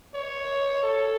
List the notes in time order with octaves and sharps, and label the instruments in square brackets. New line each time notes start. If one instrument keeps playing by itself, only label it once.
[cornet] C#5
A4